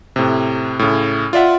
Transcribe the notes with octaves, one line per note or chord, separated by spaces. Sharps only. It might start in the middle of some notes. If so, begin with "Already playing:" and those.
A2 C3
A2 C#3
F4 D5 E5 F#5